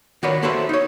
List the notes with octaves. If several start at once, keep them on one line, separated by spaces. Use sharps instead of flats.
D#3 D4 F#4 A#4 B4 C#5
A#3 F#4 A4 B4 C5 E5
D#4 C#5